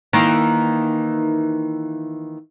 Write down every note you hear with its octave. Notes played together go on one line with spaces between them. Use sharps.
D#3 E3 A#3